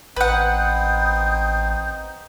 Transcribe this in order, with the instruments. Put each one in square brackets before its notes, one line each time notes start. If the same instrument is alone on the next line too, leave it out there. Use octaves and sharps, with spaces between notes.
[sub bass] A1 [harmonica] C4 D#4 [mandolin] B4 F#5 [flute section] D#6 G6